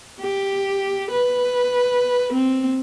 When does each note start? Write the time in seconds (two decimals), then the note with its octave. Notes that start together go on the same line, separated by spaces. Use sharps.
0.22 G4
1.12 B4
2.34 C4